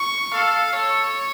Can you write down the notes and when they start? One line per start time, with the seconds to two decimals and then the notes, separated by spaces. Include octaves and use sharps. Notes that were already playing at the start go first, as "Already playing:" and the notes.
Already playing: C#6
0.33 A4 F5
0.73 A4 C#5